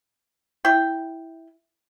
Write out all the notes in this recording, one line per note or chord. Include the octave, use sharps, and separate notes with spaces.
E4 G5